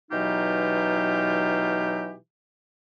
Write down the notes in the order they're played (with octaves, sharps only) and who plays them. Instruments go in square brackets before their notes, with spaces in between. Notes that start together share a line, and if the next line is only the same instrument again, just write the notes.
[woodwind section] B2 E3 F#3 D#4 F4 G4